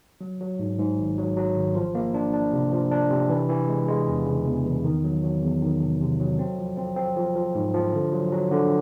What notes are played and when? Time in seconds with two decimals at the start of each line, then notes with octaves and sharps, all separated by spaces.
0.21 F#3
0.41 F#3
0.59 G#2
0.79 G#2
0.98 G#1
1.18 F#3
1.37 F#3
1.56 G#1
1.75 F3
1.95 A#3
2.14 D4
2.33 D4
2.53 C3
2.72 F3
2.91 D4
3.11 C3
3.30 E3
3.49 E3
3.68 G#3
3.88 G#3
4.07 E2
4.26 C#3
4.46 E2
4.65 E2
4.84 D#3
5.04 F#3
5.23 F#3
5.42 E2
5.62 D#3
5.81 C3
6.00 C3
6.20 F#3
6.39 C4
6.59 F3
6.77 C4
6.96 C4
7.16 F3
7.35 F3
7.55 G#2
7.74 F3
7.93 D3
8.13 F#3
8.32 F#3
8.52 D3